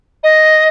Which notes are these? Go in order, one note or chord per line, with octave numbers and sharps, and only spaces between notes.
D#5